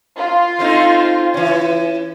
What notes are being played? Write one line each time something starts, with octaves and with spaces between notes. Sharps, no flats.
F4
A3 C4 D#4
E3 C#4